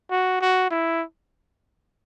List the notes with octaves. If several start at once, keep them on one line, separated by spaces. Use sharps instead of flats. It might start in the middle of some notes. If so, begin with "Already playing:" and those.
F#4
F#4
E4